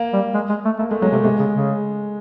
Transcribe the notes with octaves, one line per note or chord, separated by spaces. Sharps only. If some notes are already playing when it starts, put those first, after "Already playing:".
Already playing: A#3
G3
G#3
G#3
A3
A3 A#3
G#3 A3
F#3 G#3
C3 A3
C3 G#3
C#3
C#3